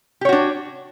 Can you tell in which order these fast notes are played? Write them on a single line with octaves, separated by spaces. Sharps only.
G4 C#5 F#4 D4